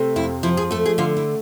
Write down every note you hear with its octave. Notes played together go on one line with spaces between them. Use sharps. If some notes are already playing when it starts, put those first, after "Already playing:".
Already playing: C3 A3
F2 E4
F3 E4
G#4
A3 A4
G#4
D3 F4
E4